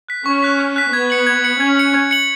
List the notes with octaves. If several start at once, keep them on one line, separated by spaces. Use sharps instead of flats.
F#6 B6
C#4 C#6
F#6 B6
C#6
F#6 B6
B3 G#6
C#7 F#7
G#6
C#7 F#7
C#4 G#6
C#7 F#7
G#6
C#7 F#7